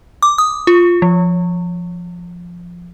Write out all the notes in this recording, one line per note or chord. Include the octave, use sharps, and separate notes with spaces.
D6
D#6
F4
F3